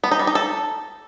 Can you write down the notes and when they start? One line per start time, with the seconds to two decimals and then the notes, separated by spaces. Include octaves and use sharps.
0.04 B3
0.11 D#4
0.19 G3
0.27 D#4
0.35 A4